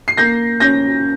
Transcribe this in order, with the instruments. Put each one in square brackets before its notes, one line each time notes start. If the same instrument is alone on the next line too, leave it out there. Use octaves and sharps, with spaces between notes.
[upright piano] C7
A#3 G6 A#6
C#4 G6 A#6